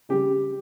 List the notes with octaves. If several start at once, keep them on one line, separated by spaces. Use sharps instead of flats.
C#3 G3 G4